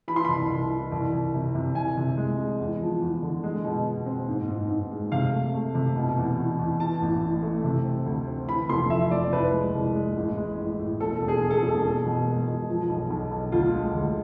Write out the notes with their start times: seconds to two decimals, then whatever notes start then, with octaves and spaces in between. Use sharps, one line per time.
0.08 E3 B5
0.16 C6
0.25 C2 B5
0.50 C2
0.70 E3
0.92 C2
1.12 C2
1.34 C3
1.55 C3
1.75 C2 G#5
1.97 C3
2.17 G#3
2.39 G#3
2.60 E2
2.81 F3
3.02 E2
3.22 D3
3.43 G#3
3.65 B2
3.86 B2
4.06 C4
4.28 G#2
4.49 G#2
4.70 G#2
4.91 G#3
5.12 C3 F5
5.33 A3
5.54 A3
5.75 C3
5.96 B2
6.17 E2
6.37 E2
6.59 E2
6.80 E3 A5
7.01 A1
7.22 A2
7.43 A3
7.64 C3
7.85 C4
8.06 D2
8.27 C4
8.48 E3 B5
8.70 F1 C6
8.90 F2 E5
9.11 F1 D5
9.32 C2 B4
9.53 G#3
9.74 C2
9.95 G#3
10.17 A1
10.37 G#3
10.59 A2
10.79 A2
11.00 E1 A4
11.21 E1
11.28 G#4
11.43 E1
11.51 A4
11.56 G#4
11.63 E1
11.84 E1
12.06 B2
12.26 G#3
12.48 B2
12.68 F3
12.89 B1
13.10 B1
13.31 B1
13.52 D2 F4
13.73 G#3
13.95 D2